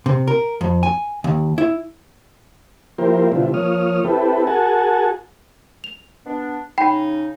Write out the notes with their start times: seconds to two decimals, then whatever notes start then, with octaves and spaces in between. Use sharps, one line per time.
0.06 C3
0.28 A#4
0.61 F2
0.83 G#5
1.24 D#2
1.58 E4
2.98 F3 A#3 E4 G4 A#4 C5
3.32 B2 D3 G3 C4 E4 F4
3.54 F3 A#3 C#5 D#6 F6
4.05 C4 E4 G4 A4 B4
4.47 F#4 G#4 A#4 F#5 G#5 A5
5.84 F7
6.25 B3 D4
6.78 C#3 C#4 D#4 G5 B5